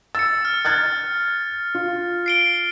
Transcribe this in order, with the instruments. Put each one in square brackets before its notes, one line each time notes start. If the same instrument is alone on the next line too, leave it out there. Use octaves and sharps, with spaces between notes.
[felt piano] E6 [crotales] A6 C#7
[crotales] F6
[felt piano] F#6 G#6 A6
F4
[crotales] C7 D7 G7